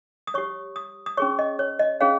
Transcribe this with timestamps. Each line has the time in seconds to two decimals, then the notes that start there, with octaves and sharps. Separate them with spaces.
0.27 D#6
0.34 G4 C#5 C#6
0.76 D#6
1.06 D#6
1.17 C#4 G#4 C#5 C#6
1.39 D#5
1.59 C#5
1.79 D#5
2.01 C#4 G#4 C#5 F5